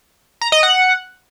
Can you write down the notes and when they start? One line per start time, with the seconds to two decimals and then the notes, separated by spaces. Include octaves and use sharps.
0.41 A#5
0.52 D#5
0.63 F#5